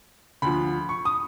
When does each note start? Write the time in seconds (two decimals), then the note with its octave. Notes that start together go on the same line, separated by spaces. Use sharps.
0.42 D2 D3 F3 B5
0.89 C#6
1.05 D#6